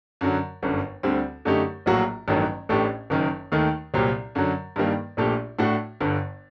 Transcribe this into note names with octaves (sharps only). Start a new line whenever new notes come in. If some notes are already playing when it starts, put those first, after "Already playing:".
F#2 D3 F#3
G1 F#2 D3
D2 D3 G3 C4
F#2 D3 A3 D#4 G4
A#1 A2 F#3 A#3 F#4
A1 G2 D#3 F#3 A3
A1 A2 A3 D4 G4
F#1 F#2 D#3
D#2 D#3 A3
C2 A#2 F#3 C4 G4
F#2 D3 F#3
G2 D#3 G3 A#3
A#1 A#2 A3 D4 G4
A2 A3 D4 F#4
G1 G2 D3